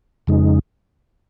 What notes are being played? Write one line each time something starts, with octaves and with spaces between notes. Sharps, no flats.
F2 C#3 G#3 D#4